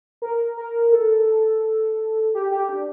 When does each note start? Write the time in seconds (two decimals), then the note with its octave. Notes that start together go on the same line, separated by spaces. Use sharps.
0.22 A#4
0.57 A#4
0.93 A4
2.35 G4
2.51 G4
2.69 D4